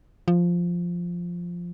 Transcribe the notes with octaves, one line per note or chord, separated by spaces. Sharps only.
F3